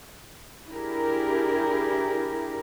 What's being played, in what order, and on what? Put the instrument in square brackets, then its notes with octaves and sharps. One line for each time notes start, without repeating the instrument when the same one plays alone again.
[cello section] D4 E4 G4 G#4 A#4